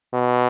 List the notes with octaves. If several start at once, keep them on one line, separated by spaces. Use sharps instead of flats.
B2